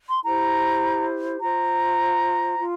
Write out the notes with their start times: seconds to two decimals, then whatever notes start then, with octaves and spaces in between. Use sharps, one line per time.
0.09 C6
0.23 E4 G4 C5 A#5
1.40 F4 C5 A#5
2.59 F4